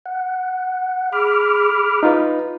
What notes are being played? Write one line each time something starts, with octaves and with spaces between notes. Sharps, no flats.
F#5
G#4 B5 D6 F6
D#4 F4 B4